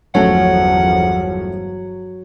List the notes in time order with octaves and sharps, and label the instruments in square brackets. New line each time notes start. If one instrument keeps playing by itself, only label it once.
[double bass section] G1 E2 F3 [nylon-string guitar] F#3 [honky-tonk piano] A3 C#4 [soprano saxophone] F#5